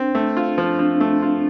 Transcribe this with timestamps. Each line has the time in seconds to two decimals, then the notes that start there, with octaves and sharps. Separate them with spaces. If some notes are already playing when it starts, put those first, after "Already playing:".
Already playing: C4 D4
0.15 A3
0.37 F4
0.58 F3
0.73 D4
0.79 F3 C4
1.01 A3
1.22 F4